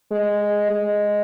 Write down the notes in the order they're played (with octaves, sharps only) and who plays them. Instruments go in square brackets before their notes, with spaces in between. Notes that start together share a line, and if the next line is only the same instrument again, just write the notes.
[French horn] G#3
G#3